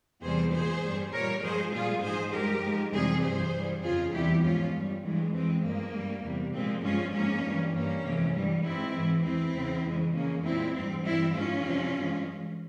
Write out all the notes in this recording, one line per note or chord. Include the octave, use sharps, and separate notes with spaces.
E2 C3 E3 G3 G#4 C5
A#2 G#3 G#4 C5
G2 G3
A#2 G3 A#4 C#5
G2 F3 G#3 G#4 C5
A#2 G3 F4 G#4
G#2 F3 G#3 G#4 C5
G2 F3 G#3 G4 A#4
G#2 F3 G#3
F2 C3 E3 G3 G#4 C5
G2 E3 G3 G#4 C5
G2 E3 G3
F2 C#3 F3 F4 G#4
E2 C3 E3 G3 E4 G4
G#2 F3 G#3 C#4 F4
G2 G3
G2 E3 G#3
F2 E3 G#3 C4
G2 F3 G#3 A#3
G2 G3
E2 C3 G3
A#2 F3 G#3 C4
G2 F3 G#3 C#4 F4
G#2 F3 G#3 A#3 C#4
G2 E3 G3
G2 G3 A#3 C#4
F2 C3 E3 G#3
G2 E3 G3
G#2 E3 G#3 C4 E4
G#2 E3 G#3
E2 E3 G#3 C4 E4
E2 C#3 E3
F2 C#3 E3 G#3
F2 C#3 E3 G#3 A#3 C#4
A#2 G#3 C4 E4
G#2 E3 G3 C4
G2 E3 G3 C4 E4
G#2 F3 G#3 C#4 F4
F2 C3 F3
G2 E3 G#3